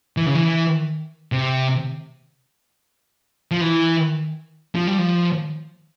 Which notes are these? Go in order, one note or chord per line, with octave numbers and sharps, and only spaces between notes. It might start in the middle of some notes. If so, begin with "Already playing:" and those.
E3
C#3
E3
C3
F3
E3
F3
G3
F3